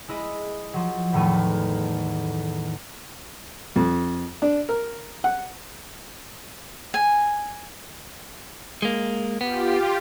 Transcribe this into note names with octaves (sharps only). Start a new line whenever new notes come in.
G#3 E4 D#5
F3 F#3
E2 A2 D#3 A3 D#7
F2
D4
A#4
F#5
G#5
G#3 A#3
B3 F4 G4